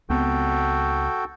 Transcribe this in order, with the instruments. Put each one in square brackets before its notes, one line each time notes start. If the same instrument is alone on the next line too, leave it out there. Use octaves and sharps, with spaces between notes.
[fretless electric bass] C#2 B3 C4 [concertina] F#4 A4 G5